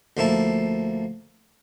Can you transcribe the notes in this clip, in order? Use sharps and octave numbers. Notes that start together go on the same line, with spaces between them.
D2 F3 A#3 E4 A5